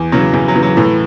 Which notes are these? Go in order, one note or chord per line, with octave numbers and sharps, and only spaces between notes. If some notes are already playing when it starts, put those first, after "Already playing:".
Already playing: E2
C#3 E3 F#3
E2 E3
F#3
C#3 E3
F#3
A2 E3